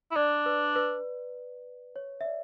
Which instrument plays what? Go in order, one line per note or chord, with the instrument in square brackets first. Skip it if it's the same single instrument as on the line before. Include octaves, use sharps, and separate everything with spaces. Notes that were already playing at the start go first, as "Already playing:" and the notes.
[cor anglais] E4
[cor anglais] D4 [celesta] D5
[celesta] B4
B4
C#5
E5
D5